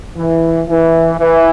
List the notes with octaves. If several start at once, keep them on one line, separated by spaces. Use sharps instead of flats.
E3
E3
E3